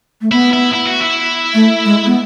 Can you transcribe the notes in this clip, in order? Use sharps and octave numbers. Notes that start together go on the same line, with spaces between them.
A3
B3 E4
E4
E4
F#4
E4
A3
G#3
B3